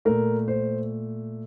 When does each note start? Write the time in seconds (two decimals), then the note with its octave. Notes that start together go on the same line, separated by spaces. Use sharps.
0.05 A#2 A3 A#4
0.48 C5